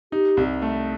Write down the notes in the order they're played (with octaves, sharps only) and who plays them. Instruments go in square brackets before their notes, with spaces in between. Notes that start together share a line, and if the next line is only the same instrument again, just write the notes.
[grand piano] D#4 [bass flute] G4
[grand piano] C2
A3